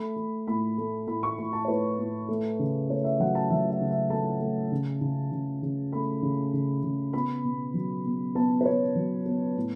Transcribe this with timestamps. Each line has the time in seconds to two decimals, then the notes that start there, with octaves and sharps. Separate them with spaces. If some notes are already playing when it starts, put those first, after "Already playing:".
Already playing: A3 B5
0.16 A3
0.47 A2 B5
0.78 A3
1.07 A2 B5
1.23 C#6
1.38 A2 B5
1.53 A5
1.65 C#5
1.68 A2 B4
1.99 A2
2.28 A3
2.59 C#3
2.89 A3 C#5
3.04 E5
3.20 F#3 F#5
3.35 A5
3.50 F#3 E5
3.70 E5
3.81 C#3
3.91 E5
4.10 A3 A5
4.41 A3
4.72 C#3
5.01 C#3
5.32 C#3
5.62 C#3
5.93 A3 B5
6.22 C#3
6.53 C#3
6.83 C#3
7.13 B3 B5
7.44 B2
7.74 F#3
8.05 B2
8.35 B3 A5
8.61 B4
8.66 B3 C#5
8.95 F#3
9.26 B3
9.56 A2